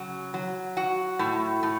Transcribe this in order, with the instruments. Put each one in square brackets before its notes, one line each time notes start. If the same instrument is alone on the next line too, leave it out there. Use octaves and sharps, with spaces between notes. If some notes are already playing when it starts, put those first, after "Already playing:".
Already playing: [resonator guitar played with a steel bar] C#3 F#3
F#3
F#4
A2
A2